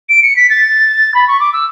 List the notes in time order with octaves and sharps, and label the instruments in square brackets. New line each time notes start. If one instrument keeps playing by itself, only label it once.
[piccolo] D7
C#7
B6
A6
B5
C#6
D6
E6